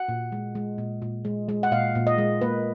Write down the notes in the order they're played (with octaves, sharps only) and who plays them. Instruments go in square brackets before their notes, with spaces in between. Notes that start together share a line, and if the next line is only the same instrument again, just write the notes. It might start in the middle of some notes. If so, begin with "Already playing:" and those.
Already playing: [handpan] F#5
A#2
G#3
G#3
A#2
A#2
G#3
G#3
F#5
A#2 F5
A#2
D#5
G#3
A#3 B4